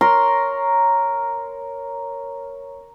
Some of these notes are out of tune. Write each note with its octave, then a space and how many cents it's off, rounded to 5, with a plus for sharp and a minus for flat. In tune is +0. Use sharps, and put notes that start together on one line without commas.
A#4 +0 C#5 +0 C6 -5